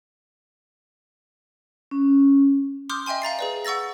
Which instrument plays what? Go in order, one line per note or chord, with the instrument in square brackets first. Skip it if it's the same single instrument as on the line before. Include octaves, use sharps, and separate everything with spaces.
[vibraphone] C#4
[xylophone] C6 D6 D#6 F6 G6
D#5 E5 G5 G#5 C6
F5 A#5 A6 C7
G#4 B4 D5
F#5 C#6 E6 A6 A#6